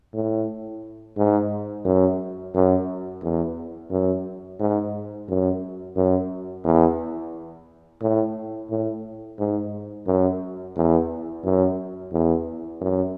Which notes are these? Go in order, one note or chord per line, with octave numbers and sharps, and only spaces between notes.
A2
G#2
F#2
F#2
E2
F#2
G#2
F#2
F#2
E2
A2
A2
G#2
F#2
E2
F#2
E2
F#2